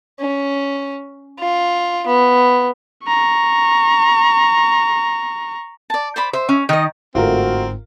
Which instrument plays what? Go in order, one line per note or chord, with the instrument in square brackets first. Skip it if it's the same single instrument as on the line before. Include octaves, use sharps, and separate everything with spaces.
[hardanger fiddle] C#4
F4
B3
[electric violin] A#5 C#6
[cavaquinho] D5 A5
C5 D5 B5
[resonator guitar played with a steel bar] C5 [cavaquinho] E5
[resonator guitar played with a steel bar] C#4
[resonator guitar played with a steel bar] D#3 [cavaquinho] D#4 D#5
[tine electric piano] G1 G#2 [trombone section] A3 F#4 [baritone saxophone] C4 [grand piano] F4 A#4